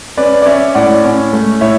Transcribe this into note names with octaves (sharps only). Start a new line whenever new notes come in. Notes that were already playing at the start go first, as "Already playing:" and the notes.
C#4 B4 D5
D5
C#4 C#5 E5
A2 D5 F#5
C#4
A3
A2 C#5 E5